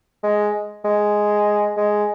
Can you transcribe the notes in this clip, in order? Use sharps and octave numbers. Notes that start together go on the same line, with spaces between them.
G#3
G#3
G#3